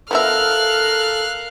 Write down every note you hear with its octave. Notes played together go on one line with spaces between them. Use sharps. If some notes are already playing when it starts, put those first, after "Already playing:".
F3 B3 A4 A#4 E5 F5 F6 F#6